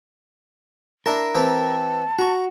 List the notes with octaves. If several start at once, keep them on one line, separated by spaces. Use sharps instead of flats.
D4 E4 A#4 A5
E3 C4 G4 A5
F#4 A#5 C#6